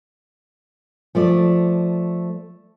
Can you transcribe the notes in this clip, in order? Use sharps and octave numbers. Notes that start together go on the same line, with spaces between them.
F3 A3 D5